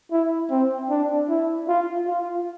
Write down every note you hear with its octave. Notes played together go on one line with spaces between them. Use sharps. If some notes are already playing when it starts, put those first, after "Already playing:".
E4
C4
D4
E4
F4
F4